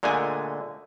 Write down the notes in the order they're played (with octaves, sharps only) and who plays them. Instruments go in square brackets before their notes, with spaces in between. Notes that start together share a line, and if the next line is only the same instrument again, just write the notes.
[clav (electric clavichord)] A#2 D3 G#3 A3 G#5